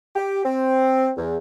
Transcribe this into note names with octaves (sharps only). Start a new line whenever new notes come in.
G4
C4
E2